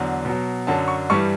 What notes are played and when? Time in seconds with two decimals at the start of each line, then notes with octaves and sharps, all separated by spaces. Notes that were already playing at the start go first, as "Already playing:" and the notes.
Already playing: E2 D3 F#3
0.25 B2 F#3
0.67 F#2 D3 F#3 A5
0.88 C#6
1.10 G2 E3 G3 C#6